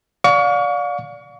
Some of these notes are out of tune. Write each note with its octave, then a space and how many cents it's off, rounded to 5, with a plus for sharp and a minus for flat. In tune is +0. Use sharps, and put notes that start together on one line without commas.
D5 -15 F5 +35 C#6 +30